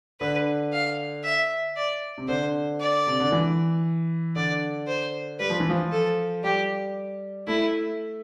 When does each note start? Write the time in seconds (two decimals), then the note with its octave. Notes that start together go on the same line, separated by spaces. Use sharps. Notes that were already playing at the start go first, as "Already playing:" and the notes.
0.20 D3 B4
0.73 F5
1.24 E5
1.77 D5
2.18 C3
2.28 D3 C5
2.80 D5
3.07 C3
3.20 D3
3.32 E3
4.36 D3 D5
4.87 C5
5.40 G3 B4
5.50 F3
5.60 E3
5.70 F3
5.92 A4
6.43 G3 G4
7.47 A3 E4